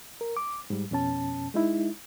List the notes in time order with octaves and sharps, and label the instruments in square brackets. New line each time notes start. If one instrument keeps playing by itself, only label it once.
[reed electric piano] A#4
D6
G#2 G3
F2 B2 C#4 A5
G#3 D#4 E4